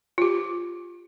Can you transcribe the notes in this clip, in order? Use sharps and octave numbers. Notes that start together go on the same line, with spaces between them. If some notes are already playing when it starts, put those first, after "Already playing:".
F4 G4